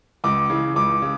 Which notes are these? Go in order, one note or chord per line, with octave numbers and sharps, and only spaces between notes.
C#2 D6
C#3 E3
C#2 D6
C#3